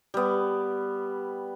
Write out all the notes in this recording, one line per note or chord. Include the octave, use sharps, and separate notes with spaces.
G3 B3